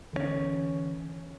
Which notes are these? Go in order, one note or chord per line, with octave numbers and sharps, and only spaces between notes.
D3 E3 A#3 C#4